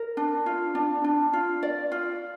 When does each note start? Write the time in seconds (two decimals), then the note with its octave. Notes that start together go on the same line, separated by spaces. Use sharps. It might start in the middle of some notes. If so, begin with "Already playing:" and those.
Already playing: A#4
0.17 D4
0.46 F4
0.75 D4
1.04 D4
1.33 F4
1.63 D5
1.92 F4